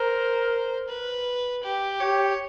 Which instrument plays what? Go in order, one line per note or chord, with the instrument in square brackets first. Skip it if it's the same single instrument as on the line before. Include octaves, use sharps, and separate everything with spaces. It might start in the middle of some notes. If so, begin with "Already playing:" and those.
Already playing: [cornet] A#4 [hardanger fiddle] C5
[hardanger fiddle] B4
G4
[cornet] G4 [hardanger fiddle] C#5